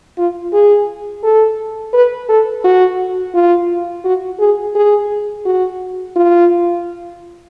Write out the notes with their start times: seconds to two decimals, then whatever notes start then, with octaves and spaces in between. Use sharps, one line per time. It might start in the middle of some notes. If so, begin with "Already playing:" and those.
0.18 F4
0.53 G#4
1.24 A4
1.94 B4
2.29 A4
2.64 F#4
3.35 F4
4.05 F#4
4.40 G#4
4.75 G#4
5.46 F#4
6.16 F4